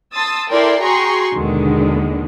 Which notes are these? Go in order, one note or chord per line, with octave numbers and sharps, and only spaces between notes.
A5 C6 D#6 E6 A6
E4 A4 A#4 D5 G5 C6
F#4 G#4 G5 A#5 C6 C#6
D#2 B2 D3 D#3 G#3